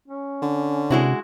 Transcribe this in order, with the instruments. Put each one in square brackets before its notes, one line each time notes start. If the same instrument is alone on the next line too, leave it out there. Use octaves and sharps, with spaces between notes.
[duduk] C#4
[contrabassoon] D3
[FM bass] C3 [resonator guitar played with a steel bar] G#3 E4 F#4